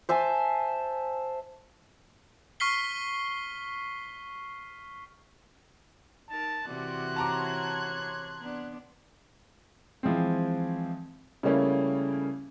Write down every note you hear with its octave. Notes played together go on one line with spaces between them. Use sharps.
C5 E5 G#5 A5
C#6 F6 B6 C7 G7
D#4 A#4 A5
C3 E3 F#4 D5 C6 F#6 G#6
C#5 A5 A#5 D6
B3 D4
E3 F3 G#3 C4
C#3 G3 A3 A#3 C#4 E4